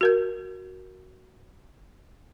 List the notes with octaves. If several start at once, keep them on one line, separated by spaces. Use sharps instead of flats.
F#4 A#4 G6